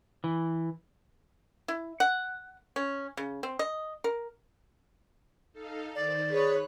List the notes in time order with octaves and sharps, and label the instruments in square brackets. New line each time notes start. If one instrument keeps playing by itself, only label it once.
[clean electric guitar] E3
[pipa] E4
F#5
C#4
C#3
C4
D#5
A#4
[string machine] D#4 A4 F5
[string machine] D#3 C5 [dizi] D5
[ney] G#4 [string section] B4 C#5 [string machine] F#6